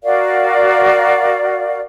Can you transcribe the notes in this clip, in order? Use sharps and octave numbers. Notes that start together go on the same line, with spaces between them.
F#4 A#4 D5 F5